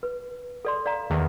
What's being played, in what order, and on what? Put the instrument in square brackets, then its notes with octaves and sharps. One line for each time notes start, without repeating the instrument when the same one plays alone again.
[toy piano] B4
A4 D5 C6
D5 F5 A#5
[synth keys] E2 D#3